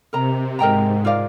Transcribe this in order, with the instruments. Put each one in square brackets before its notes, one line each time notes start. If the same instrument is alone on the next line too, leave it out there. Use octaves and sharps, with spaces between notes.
[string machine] C3 [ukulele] A#4 D#5 A#5
[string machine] G#2 [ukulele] A#4 D#5 G5 A#5
[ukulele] F4 A#4 D5 F5